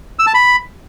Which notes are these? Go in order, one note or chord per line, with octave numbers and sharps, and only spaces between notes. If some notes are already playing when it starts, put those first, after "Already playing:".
E6
A5
B5